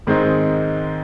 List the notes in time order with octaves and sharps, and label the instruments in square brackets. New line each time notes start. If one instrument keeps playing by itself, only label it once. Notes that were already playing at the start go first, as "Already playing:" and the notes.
[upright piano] G#2 D#3 G#3 C4 D#4